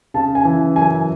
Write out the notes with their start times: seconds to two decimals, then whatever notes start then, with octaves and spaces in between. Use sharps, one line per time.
0.14 C#3 A5
0.35 G#5
0.45 E3
0.76 F#2 G#5